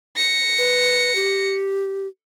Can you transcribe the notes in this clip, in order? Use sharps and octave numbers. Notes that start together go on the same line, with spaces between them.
A#6 C#7
B4
G4